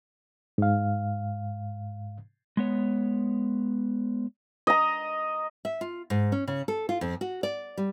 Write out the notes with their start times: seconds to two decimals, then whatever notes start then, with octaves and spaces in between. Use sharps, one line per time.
0.58 G#2 F5
2.57 G#3 B3 C#5
4.67 D#5 A#5
5.65 E5
5.81 F4
6.10 G#2
6.32 C#4
6.48 C#3
6.68 A4
6.89 F4
7.01 F2
7.21 F#4
7.43 D5
7.77 G3